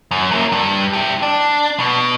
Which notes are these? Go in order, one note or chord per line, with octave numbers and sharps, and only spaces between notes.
F#2
A#3 E4
G2
E4 G4
D4
B2